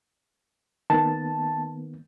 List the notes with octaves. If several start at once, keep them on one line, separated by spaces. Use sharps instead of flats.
D#3 A#3 B3 A5